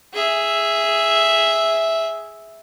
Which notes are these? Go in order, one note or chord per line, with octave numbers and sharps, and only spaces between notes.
G#4 E5